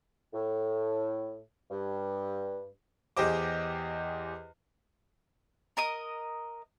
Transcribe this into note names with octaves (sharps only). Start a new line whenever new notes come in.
A2
G2
E2 G4 G#4 C5 D#5 D6
A#4 D#5 D#6